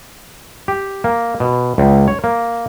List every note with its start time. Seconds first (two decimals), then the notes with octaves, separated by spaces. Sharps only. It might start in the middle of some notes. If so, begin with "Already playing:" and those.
0.68 G4
1.04 A#3
1.40 B2
1.78 C#2
2.08 C#5
2.24 A#3